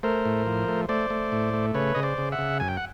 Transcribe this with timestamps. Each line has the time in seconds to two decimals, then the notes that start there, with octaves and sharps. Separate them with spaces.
0.03 A3 A#4 C5
0.25 A2
0.46 F3
0.68 A3
0.89 A3 C5 D5
1.10 A3
1.32 A2
1.54 A3
1.74 C#3 B4 C#5
1.95 C#3 D#5
2.03 C5 D5
2.18 C#3
2.32 E5 F#5
2.39 C#3
2.60 F#2 G#5
2.68 G5
2.77 F#5